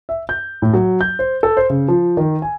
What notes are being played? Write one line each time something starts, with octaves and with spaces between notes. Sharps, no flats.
E5
G6
A2
F#3
G6
C5
A4
C5
C#3
F3
D#3
G#5